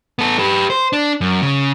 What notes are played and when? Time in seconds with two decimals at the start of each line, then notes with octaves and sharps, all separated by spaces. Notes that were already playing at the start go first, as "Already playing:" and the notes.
0.19 B3 A4
0.39 G4 B4
0.70 C5
0.93 D4
1.21 F#2
1.42 C#3